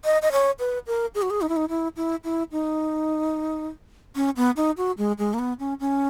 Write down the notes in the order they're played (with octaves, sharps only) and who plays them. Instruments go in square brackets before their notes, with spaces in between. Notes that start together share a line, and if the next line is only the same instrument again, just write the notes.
[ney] D#5
D#5
C#5
B4
A#4
G#4
F#4
G#4
D#4
E4
D#4
E4
E4
E4
D#4
C#4
B3
D#4
F#4
G#3
G#3
A#3
B3
C#4
C#4